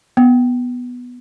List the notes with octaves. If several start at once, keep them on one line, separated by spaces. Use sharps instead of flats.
B3